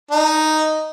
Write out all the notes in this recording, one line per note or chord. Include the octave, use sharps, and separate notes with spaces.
D#4